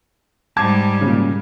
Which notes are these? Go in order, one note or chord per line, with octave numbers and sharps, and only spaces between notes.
G#2 G3 A5 D6 G#6
A#2 C#3